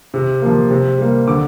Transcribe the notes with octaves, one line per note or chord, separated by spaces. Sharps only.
C3
F3 A#3
C3
G3 A#3
D3 D6